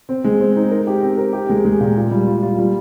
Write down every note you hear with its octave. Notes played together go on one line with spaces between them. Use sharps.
C4
G#3
C4
D#4
A#4
G4
C4
A#4
G4
G#3
G#3
A#2
F4
G3
F4
F4
G3